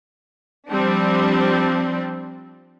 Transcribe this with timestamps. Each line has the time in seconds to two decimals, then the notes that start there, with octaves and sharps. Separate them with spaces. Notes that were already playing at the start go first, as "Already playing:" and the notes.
0.70 F3 G3 C4 D4